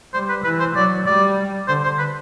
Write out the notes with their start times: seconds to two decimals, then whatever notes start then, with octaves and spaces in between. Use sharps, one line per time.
0.14 G3 C5
0.29 B4
0.44 E3 B4
0.60 C5
0.75 F#3 D5
1.06 G3 D5
1.68 D3 C5
1.84 C5
1.99 B4